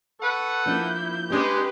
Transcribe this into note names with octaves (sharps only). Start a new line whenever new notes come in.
A4 B4 F#5 C#6
F3 A#3 D4 E4 G6
G#3 C4 D4 G4 B4